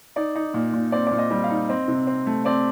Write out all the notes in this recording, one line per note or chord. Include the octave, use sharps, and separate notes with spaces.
D#4 D5
D#4
A#2
A#2
C4 D5
A#2 D5
D#5
G3
F5
D#4
C4 D#5
C3
C4
A3
C4 D5